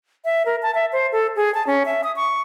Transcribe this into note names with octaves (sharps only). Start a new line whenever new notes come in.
E5
A#4
A5
E5
C5
A4
G#4
A5
C#4
E5
D#6
C#6